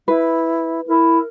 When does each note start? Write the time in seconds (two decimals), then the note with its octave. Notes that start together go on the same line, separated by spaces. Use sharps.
0.08 E4 B4
0.88 E4 A#4